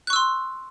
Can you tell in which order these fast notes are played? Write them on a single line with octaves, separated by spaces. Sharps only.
F#6 C#6 E6 C6